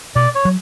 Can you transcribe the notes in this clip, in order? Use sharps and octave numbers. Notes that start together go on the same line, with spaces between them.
B2 D5
C#5
F#3